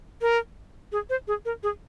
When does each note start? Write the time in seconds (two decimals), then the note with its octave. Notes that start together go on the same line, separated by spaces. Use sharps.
0.22 A#4
0.92 G#4
1.10 C5
1.28 G#4
1.45 A#4
1.63 G#4